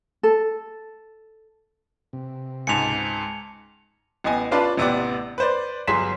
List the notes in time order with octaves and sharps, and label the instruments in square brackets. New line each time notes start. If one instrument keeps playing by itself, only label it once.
[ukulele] A4
[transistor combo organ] C3
[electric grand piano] C#2 G#2 [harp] G#5 A5 [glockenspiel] C#7 F7
[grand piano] A1 B3 D#5 G#5
C#4 D4 F4 B4 D5 A5
A1 C3 B3 D5 D6
B4 C5 D5
G1 F#3 G#4 C6 B6 E7